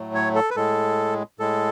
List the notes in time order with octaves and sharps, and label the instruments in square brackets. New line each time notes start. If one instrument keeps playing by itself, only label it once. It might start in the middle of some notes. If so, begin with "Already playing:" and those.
Already playing: [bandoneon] A2 F#3 A3
C#5
A4
B4
A2 G#3 A4
A2 G#3 A4